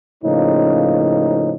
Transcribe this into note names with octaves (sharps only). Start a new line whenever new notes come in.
A2 C#3 F3 A#3 C#4 D#4